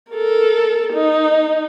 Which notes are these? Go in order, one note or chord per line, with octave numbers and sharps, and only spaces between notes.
A4 A#4
D#4